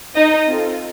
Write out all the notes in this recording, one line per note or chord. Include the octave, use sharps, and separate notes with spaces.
D#4 D#5
C4 F4 A4